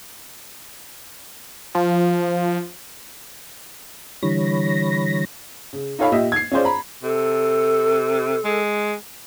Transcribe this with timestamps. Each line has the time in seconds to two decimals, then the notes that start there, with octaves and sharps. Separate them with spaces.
1.75 F3
4.23 D3 E3 G3 C#5 B5 A#6
5.73 C#3
5.99 D#4 F4 A4 C#5 F5 B5
6.12 A#2 G4 D#5 E5
6.32 G#6 C7
6.52 C#4 F4 G#4 C5 D5
6.65 A#5 B5
7.03 C3 A4
8.44 G#3